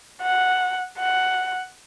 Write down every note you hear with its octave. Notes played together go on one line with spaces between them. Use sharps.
F#5
F#5